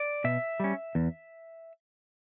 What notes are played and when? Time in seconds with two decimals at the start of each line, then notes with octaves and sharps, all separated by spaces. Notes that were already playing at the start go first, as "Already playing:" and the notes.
Already playing: D5
0.24 B2 E5
0.60 G3 C#4
0.95 E2